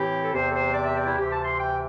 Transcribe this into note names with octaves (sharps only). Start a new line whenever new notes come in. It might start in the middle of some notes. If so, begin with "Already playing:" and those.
Already playing: A2 E3 C4 G4
A4
E2 C3 E3 C4 C5
A4
C5
D5
E5
D5
E4
D2 C3 E3 G4
A5
C6
G5